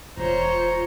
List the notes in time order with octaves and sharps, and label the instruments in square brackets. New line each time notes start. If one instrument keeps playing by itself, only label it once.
[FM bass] E1 [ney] F4 [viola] C5 [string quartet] C#5 A#5